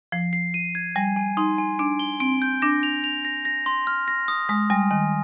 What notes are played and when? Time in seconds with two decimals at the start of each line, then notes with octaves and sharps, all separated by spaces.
0.12 F3 C7
0.33 C7
0.54 D#7
0.75 G#6
0.96 G3 G#5
1.16 G#5
1.37 D#4 C6
1.58 G#5
1.79 D4 D7
1.99 G7
2.20 C4 D7
2.42 G6
2.62 D4 A#6
2.83 F7
3.04 F7
3.25 A#6
3.45 A#6
3.66 C6
3.87 F6
4.08 A#6
4.28 D#6
4.49 G#3 D#6
4.70 G3 G#5
4.91 D#3 G#5